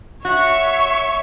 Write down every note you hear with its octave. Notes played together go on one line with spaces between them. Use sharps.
F#4 C#5 E5 C#6